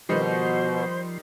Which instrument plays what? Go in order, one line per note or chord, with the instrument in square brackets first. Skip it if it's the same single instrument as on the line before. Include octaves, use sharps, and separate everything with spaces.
[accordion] B2 [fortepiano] D#3 G3 D#4 [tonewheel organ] F3 C6 [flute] C5